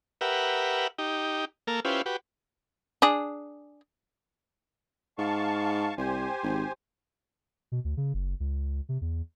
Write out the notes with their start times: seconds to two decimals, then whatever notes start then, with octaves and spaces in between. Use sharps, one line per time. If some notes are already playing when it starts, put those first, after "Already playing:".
0.21 G4 A#4 B4 E5 F#5
0.98 D#4 G4
1.67 A#3 A4 A#4
1.85 C#4 E4 F4 G4 B4 C5
2.06 F#4 G4 B4
3.02 D4 G#4
5.18 G#2 F5 A5 C#6
5.98 C2 G4 C5 G#5
6.43 G#1
7.72 B2
7.84 D2
7.97 C#3
8.14 F#1
8.40 C#2
8.89 C3
9.01 E2